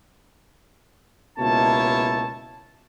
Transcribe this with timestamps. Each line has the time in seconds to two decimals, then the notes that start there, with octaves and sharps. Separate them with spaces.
1.39 C#2 B2 A#3 E4 C#5 A5